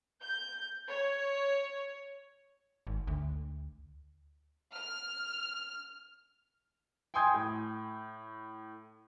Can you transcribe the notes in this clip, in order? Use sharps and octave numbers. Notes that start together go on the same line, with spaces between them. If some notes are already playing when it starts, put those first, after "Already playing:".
G6
C#5
G#1
D2
F6
G5 G#5 C6 D#6 G6 G#6
A2